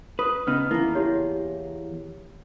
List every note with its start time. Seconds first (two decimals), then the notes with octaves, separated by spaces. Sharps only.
0.19 B4 D#6
0.47 C#3 B3 D#4 F6
0.71 E2 A#3 E4
0.95 E4 G4 C#5